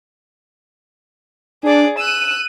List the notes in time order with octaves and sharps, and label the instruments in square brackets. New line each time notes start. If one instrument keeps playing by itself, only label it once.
[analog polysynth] D4 [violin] G#4 D5
[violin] E6 F#6 [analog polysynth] D#7